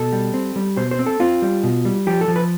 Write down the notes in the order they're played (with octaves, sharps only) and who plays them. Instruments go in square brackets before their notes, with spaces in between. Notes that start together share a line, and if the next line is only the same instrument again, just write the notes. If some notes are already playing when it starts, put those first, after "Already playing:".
Already playing: [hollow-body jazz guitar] B2 A4
G3
C4
G3
B2 C5
C5
C4
A4
C4 F4
G3
B2
G3
F3 G4
A4
F3
B4